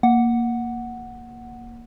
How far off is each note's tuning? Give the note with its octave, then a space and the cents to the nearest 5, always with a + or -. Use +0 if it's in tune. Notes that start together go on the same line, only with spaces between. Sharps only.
A#3 +0 F#5 +0